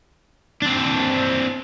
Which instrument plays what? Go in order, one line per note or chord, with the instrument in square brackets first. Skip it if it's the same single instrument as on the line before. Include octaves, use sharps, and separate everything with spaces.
[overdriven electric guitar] C4 D4